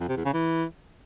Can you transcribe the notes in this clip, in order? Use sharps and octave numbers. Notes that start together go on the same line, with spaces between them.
F2
C3
E2
C#3
E3